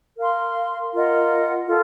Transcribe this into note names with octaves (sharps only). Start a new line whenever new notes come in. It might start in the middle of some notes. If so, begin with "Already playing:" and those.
A#4 F5 C6
F4 A#4 D#5 F#5
F4 A4